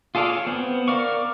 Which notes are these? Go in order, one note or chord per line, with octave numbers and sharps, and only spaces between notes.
F4 G#4 A4 D5 F5
C#5
B3 C4
A#4 D5 F5 C#6